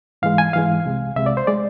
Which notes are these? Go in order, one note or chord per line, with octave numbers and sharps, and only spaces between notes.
G#2 E3 G#3 F5
G#5
G#2 E3 G#3 F5
C2 C3 G#3
C2 C3 G#3 E5
D5
C5
G#3 D5